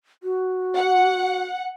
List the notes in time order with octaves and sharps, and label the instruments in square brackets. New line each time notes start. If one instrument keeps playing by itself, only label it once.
[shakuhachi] F#4
[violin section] F#5